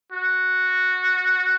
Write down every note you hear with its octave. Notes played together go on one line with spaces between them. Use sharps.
F#4